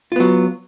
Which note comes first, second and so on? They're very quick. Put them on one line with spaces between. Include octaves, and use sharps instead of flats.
F4 B3 F#3